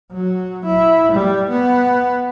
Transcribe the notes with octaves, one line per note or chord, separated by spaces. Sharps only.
F#3
E4
G3
B3